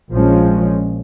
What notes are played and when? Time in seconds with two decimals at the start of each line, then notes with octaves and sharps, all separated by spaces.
0.11 A#1 A#2 F3 G#3 C#4